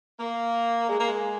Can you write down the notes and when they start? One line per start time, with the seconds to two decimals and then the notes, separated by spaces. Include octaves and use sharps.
0.19 A#3
0.89 G#3
0.99 A#3
1.08 G#3